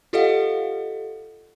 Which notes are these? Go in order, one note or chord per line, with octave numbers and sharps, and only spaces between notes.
F4 G4 A4 D#5 F5 F#5